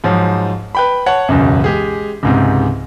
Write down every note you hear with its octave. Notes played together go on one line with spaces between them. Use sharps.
G#2 F3 F#3
B4 G5 B5
C#5 F#5 A5
E1 C#2 F#2
G#3 G4 G#4
C#2 G#2 C3